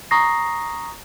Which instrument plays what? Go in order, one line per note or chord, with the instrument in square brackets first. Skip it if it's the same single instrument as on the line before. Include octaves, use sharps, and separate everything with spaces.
[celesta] A#5 C#6 D#6 A#6 C7